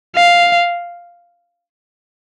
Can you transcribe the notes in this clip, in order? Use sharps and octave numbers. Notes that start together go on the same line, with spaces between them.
F5